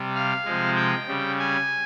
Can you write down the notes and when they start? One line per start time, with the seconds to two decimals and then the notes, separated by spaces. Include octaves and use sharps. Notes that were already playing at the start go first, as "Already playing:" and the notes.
Already playing: C3 G3
0.15 F5
0.45 C3 F3 G#3
0.76 G5
1.08 C#3 G3
1.39 G#5